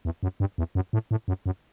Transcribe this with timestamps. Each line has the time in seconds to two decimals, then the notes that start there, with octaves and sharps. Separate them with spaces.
0.05 E2
0.23 F#2
0.40 G2
0.58 E2
0.75 F#2
0.93 A2
1.11 A2
1.28 F#2
1.46 F#2